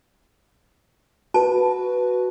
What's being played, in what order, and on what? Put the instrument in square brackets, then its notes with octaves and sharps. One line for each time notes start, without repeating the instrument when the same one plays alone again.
[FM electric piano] F#4 B4 [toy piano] A5